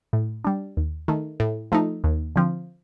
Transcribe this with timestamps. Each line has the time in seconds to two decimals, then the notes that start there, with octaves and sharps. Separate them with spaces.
0.13 A2
0.45 G3 D4
0.77 D#2
1.08 D#3 A3
1.40 A2
1.72 F3 A3 D#4
2.04 D#2
2.36 D3 F3 C4